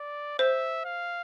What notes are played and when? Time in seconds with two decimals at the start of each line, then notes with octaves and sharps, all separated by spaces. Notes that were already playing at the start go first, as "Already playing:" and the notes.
Already playing: D5
0.39 C5 E5
0.85 F5